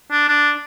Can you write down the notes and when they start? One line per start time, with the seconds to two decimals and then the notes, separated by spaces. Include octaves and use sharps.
0.11 D4
0.28 D4